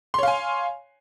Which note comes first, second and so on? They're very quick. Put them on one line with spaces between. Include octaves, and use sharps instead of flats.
C6 C#5 F5 G#5